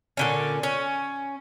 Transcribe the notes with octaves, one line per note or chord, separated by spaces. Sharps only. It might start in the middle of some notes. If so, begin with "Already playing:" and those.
A#2 D3 C#4
C#4